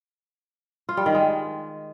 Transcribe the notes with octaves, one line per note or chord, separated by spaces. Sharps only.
F4
G3
D#3
G#3